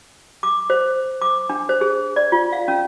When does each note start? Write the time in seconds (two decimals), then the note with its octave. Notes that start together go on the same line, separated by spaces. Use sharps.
0.43 D6
0.70 C5
1.22 D6
1.49 D4
1.69 C5
1.81 G#4
2.16 D5
2.32 F4
2.53 F5
2.68 C#4